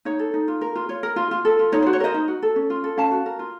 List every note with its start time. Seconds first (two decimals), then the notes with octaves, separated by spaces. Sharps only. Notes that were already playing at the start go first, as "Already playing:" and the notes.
0.05 D#4 C#5
0.19 A4
0.34 D#4
0.48 F4
0.61 A#4
0.76 F4
0.89 F4 C#5
1.03 A#4
1.16 F4
1.31 F4
1.45 A4
1.59 F4
1.72 D#4 C#5
1.83 C5
1.87 F#4
1.93 C#5
2.00 A#4 C5 D#5
2.14 D#4
2.28 F#4
2.42 A4
2.56 C#4
2.70 F4
2.84 A4
2.97 C#4 F5 A5
3.12 F#4
3.26 A#4
3.39 F4